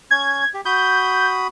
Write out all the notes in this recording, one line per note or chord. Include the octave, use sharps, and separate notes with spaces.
C#4 G#6
G4
F#4 B5 D#6 G6